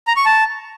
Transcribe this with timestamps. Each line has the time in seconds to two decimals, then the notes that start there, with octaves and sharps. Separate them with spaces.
0.07 A#5
0.16 C#6
0.26 A5